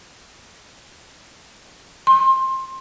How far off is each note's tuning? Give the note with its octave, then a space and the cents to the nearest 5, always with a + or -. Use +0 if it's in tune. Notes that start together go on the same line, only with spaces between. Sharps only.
C6 +20